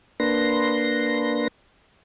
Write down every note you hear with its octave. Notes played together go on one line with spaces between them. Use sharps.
A#3 D4 B4 C6 A#6